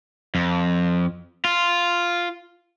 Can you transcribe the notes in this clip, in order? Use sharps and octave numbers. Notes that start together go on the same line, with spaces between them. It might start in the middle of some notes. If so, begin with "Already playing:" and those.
F2
F4